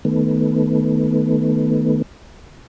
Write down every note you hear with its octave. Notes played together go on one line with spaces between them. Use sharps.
D#3 A3 B3